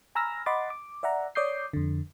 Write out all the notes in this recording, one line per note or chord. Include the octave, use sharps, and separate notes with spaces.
G#5 A#5 B5 E6 F6 A#6
D#5 F#5 B5 C6 D6 A6
D6
D5 E5 F#5 A#5
C#5 D5 D6 D#6 G6 C7
F2 D3